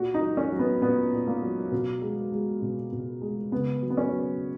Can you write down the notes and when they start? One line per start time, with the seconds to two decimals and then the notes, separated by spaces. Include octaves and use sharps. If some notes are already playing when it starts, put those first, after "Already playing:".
Already playing: A#2 F#4
0.14 D#4
0.22 F#3
0.37 C#4
0.52 F#3
0.59 B3
0.82 A#2 B3
1.12 A#2
1.27 A#3
1.42 F#3
1.71 B2
2.02 G#3
2.32 G#3
2.62 B2
2.92 B2
3.22 G#3
3.52 C#3 B3
3.82 F#3
3.90 B3
3.97 C#4
4.12 F#3